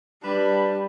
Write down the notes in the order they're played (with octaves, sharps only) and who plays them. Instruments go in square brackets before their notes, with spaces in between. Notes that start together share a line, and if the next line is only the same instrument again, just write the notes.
[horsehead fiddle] G3 [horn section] D4 B4 B5